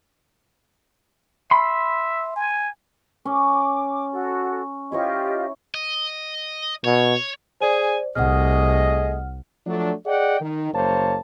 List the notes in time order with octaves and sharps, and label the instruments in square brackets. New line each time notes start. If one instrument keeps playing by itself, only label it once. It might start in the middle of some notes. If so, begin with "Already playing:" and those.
[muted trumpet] E5 [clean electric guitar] B5 C6
[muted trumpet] G#5
[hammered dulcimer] C#4 [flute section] D6
[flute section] F#4 A4
[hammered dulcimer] E4 C#5 C#6 [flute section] F4 G4 D#5
[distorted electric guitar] D#5
[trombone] B2 [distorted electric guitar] C#5
[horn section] G#4 G#5 [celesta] C5 D5
[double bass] C2 [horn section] A3 G#4 D#5 [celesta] F#5 F6
[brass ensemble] F3 F#3 A3 D4
G#4 D5 D#5 F#5 G5
D#3
F#1 A#3 C5 C#5 A5